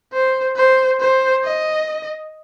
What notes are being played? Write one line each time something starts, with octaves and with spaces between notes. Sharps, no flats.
C5
C5
C5
D#5